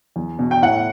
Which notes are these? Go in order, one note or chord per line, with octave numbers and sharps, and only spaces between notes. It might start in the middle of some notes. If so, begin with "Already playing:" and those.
E2
B2
G5
A2 F#5